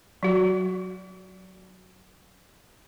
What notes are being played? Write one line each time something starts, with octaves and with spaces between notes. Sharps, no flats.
F#3 F#4